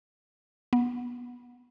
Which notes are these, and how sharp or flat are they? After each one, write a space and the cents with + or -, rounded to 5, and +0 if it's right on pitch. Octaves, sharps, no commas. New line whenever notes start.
B3 -20